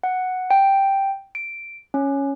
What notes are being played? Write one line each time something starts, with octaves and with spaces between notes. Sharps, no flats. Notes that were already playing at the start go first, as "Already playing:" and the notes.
F#5
G5
D7
C#4